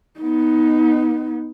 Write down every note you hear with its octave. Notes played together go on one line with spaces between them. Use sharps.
B3 D#4